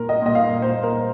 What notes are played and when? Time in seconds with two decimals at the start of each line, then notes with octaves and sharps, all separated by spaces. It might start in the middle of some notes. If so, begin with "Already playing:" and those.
Already playing: A#2 A#4
0.09 D#5
0.22 A#2 D#5
0.35 F5
0.62 A#2 C5
0.83 A#4